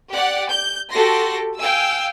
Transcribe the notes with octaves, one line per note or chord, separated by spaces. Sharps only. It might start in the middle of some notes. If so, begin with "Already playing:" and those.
G4 D5 F#5
G6
F#4 G4 A4 C6 A#6
F5 G5 G#5 E6